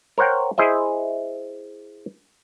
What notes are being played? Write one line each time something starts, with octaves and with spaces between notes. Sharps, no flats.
A#4 C5 C#5 F#5 G5
E4 G#4 C5 D#5 E5